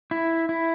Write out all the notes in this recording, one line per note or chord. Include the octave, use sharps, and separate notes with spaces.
E4
E4